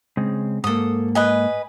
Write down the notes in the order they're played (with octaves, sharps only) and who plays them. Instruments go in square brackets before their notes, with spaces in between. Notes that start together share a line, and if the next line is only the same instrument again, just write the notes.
[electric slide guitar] C#3 G#3 C4
[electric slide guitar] G#2 A#3 [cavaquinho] A4 D#6
[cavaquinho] B4 D#5 G#5